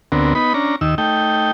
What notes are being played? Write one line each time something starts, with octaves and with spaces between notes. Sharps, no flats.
D2 D3 B3 C4 A#4
B3 D#4 B5
C#4 D4 A#5
D#2 D#3 E6
A3 D#4 G5